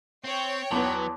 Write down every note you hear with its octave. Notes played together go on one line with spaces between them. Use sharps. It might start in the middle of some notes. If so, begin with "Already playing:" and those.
C4 C#5 G5
E2 F#3 B3 A5 C6 D6